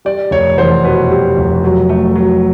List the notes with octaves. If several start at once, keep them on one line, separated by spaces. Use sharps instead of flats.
G3 D5
F1 C#5
E2 C5
B2 B4
G3
F1
F#3
A3
F#3